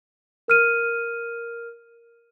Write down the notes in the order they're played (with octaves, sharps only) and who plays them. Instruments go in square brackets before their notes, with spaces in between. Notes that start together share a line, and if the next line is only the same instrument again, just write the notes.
[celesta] A#4 F6 D#7